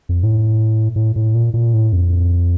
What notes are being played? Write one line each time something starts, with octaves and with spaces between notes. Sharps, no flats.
F2
A2
A2
A2
A#2
A#2
A2
F2